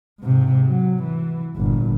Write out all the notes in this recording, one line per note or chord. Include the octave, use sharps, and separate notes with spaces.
G#2 C3
F#3
E3
G1 A#2